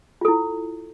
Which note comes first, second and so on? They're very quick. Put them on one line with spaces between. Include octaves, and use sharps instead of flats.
F4 A4 E4